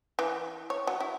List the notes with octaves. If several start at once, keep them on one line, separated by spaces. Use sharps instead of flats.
E3
C#5
F#3
E4